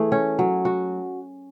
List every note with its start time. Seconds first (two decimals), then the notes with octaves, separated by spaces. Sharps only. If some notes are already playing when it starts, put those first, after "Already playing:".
Already playing: E3 A3 G#4
0.12 C#4
0.39 F#3
0.65 F#4